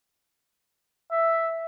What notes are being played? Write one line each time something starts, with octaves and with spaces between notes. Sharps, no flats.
E5